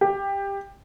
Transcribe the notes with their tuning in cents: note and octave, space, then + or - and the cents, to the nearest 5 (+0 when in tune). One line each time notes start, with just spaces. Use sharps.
G4 +10